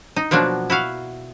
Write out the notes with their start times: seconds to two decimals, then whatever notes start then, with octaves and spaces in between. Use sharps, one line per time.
0.16 D#4
0.31 B2 F3 F#3 A#3 D4
0.70 E4 F#4 F5